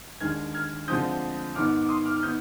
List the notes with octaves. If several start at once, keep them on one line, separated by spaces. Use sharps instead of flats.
D#2 D3 G#3 F6 G#6
F6 G#6
D2 D3 F3 G#3 C4 D#6 G6
G#2 D#3 B3 D6 F6
D6
C6 D#6
D6 F6
F6
D#3 B3 D#6 G6